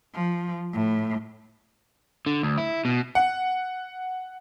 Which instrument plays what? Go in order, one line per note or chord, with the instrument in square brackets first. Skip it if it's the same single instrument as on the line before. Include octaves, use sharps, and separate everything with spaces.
[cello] F3
A2
[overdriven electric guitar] D3
D2
E4
B2
[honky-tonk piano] F#5